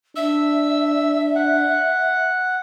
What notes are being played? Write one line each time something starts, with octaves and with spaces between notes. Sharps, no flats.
D4 E5 E6
F#5